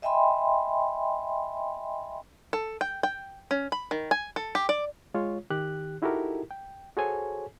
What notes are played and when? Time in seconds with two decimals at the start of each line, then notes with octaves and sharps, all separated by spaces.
0.02 D#5 E5 G5 G#5 B5 C6
2.53 A4
2.81 G5
3.03 G5
3.51 C#4
3.72 B5
3.91 D#3
4.11 G#5
4.36 A4
4.55 G4
4.69 D5
5.14 G#3 F4 C#5
5.50 D#3 G4 F#6
6.02 D#4 E4 F#4 G4 A4 A#4
6.51 G5
6.97 F#4 G#4 A4 C5 C#5 G#5